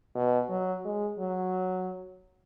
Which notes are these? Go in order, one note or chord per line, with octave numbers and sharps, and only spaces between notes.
B2
F#3
G#3
F#3